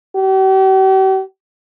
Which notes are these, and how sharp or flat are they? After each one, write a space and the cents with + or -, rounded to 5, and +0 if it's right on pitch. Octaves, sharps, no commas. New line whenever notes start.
G4 -45